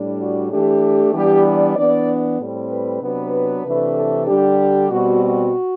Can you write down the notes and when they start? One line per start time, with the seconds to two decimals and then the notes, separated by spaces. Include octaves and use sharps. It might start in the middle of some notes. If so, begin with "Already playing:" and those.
Already playing: A2 G3 D4
0.19 F#4
0.51 E3 A3 D4 G4
1.13 E3 G3 B3 D4 G4
1.45 D5
1.76 E3 B3 D4 D5
2.40 A2 G3 C4
2.70 B4
3.02 C3 F#3 B3 D4 B4
3.65 C3 E3 A3 D4
3.95 A4
4.27 D3 G3 D4 G4
4.90 B2 G3 C4 F#4
5.22 F#4